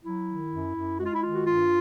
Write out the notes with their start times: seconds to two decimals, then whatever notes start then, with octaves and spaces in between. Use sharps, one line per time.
0.04 F#3 E4
0.28 D#3
0.51 F#2
0.75 F#2
0.99 G#3 F#4
1.06 F4
1.14 E4
1.22 D#3 F4
1.35 F#4
1.45 G2 F4